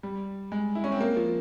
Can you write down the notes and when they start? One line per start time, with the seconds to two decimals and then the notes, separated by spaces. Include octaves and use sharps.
0.03 G3
0.52 G#3
0.75 E4
0.84 C#4
0.92 C4
1.01 A#3
1.17 F3